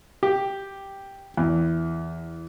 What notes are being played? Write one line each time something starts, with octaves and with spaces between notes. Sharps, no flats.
G4
E2